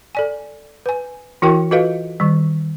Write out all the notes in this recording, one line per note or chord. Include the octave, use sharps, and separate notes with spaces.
A4 D5 G#5
B4 G#5
E3 E4 F#4 A#4 G5 C#6
F4 F#4 A4 B4 D#5 F5
D#3 G3